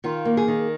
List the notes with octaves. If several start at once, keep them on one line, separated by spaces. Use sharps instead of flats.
D#3 F4
A#3
G#4
D#3